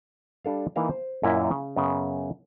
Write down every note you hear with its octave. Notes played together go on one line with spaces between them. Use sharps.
G3 D4 A4 F5
E3 A#3 D#4 A#4 F5 A#5
C5
F#2 A#2 E4 A#4 D#5
C#3
F#2 C#3 B3